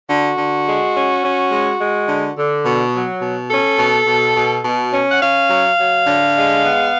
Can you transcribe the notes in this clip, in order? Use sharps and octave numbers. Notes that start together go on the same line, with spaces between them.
D3 F#4
D3
G#3
C#4
C#4
G#3
G#3
D3
D3
B2
F#3
B2
C#4 A4
B2
B2
B2
B2
C#4
F#5
C#4 F5
F#3
F#3
D3
G#3
B3